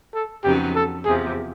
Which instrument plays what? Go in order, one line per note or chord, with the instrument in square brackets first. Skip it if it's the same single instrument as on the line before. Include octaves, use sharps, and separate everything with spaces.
[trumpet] A4
[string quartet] F2 C#3 F#3 B3 D#4 [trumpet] G4
[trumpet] A4
[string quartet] E2 C3 F3 [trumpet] G#4